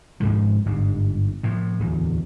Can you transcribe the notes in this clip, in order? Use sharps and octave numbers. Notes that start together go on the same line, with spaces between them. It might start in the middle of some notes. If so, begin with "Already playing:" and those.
G#1 C#2 G#2 F3
G1 G#2
A2 F3
D1 E2